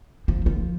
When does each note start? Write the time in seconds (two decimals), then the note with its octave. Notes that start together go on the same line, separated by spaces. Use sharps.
0.28 F3
0.46 F3